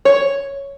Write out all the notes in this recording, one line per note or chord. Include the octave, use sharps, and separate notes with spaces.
C#5